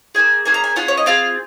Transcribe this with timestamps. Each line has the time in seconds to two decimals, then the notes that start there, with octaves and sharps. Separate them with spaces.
0.15 A#3 C#4 G#4 G#5
0.46 A#3 C#4 G#4 G#5
0.54 A#5
0.64 G#5
0.76 C#4 F4 G#4 F#5
0.88 C#5
0.97 D#5
1.06 C4 F4 G#4 F5